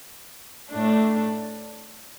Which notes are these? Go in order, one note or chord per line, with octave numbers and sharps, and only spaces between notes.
A2 A3 D4